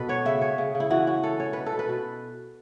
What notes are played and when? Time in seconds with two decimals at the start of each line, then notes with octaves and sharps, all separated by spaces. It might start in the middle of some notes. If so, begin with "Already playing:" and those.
Already playing: B2 A4 B4
0.09 B3 C#5
0.25 C#3 E5
0.41 C#4 C#5
0.58 C#3
0.75 C#3
0.80 E4
0.90 E3 F#4
1.07 C#4 F#4
1.23 C#4 A4
1.40 C#4 C#5
1.53 B2 B4
1.66 A4
1.72 B2
1.79 B4
1.89 B2